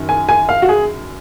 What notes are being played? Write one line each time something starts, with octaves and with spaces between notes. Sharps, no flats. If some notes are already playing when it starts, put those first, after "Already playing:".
Already playing: F#2 D#3
G#5
G#5
F5
F#4
G#4